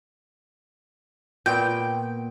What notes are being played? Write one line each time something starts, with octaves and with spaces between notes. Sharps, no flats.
A#2 B3 G5